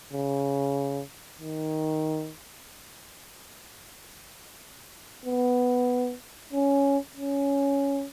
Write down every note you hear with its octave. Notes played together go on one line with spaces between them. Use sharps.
C#3
D#3
B3
C#4
C#4